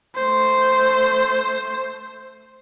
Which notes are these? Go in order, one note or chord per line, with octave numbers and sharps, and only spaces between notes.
A3 C5